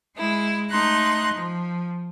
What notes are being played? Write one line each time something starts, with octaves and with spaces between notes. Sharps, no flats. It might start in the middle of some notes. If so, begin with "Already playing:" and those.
G#3 E4
A3 D#4 A#5 C6 F#6
F3